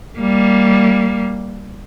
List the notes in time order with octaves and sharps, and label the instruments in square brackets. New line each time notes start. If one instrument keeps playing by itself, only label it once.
[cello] G3 A#3